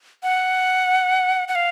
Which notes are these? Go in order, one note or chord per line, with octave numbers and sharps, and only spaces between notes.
F#5
F#5
F5